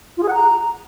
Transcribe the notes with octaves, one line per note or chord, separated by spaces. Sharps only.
F4
G#4
F#5
A#5